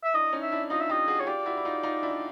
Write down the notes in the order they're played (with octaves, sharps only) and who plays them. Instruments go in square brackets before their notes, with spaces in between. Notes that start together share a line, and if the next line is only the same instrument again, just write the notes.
[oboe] E5
[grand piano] D4 E4 [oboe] D#5
[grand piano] C#4 D#4
[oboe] E5
[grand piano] D4 E4
[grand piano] D#4 F4 [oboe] D#5
[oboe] E5
[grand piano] F4 G4 [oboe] D#5
[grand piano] F#4 G#4
[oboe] C#5
[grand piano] F4 G4 [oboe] D5
[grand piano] E4 F#4
E4
D#4 F4
D#4 F4
D4 E4